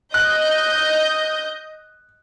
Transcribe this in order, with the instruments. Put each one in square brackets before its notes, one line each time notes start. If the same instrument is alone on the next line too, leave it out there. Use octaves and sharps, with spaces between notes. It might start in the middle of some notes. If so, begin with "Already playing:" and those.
[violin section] D#5 G6 [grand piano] F#6